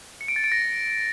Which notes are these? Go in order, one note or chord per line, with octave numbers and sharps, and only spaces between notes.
C#7
D7
A6
D7
A#6